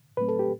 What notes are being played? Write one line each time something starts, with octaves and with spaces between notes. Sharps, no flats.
A2 F#3 A3 C4 B4
A4
G4